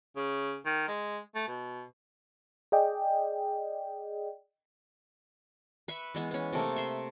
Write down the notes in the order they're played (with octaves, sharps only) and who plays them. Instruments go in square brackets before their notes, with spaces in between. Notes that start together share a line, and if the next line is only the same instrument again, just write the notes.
[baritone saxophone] C#3
D#3
G#3
A3
B2
[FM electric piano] G#4 D5 D#5 G5
[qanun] B4 E5 C#6
E3 G#3 B3
B3 C#4
C3 A3 A#3
E5 C6